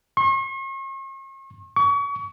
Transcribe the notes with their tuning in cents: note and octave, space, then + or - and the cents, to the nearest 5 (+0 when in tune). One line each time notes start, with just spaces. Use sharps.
C#6 -45
C#6 +35